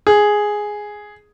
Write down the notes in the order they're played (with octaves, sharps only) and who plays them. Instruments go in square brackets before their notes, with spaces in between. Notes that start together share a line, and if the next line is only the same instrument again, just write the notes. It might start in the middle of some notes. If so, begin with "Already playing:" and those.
[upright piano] G#4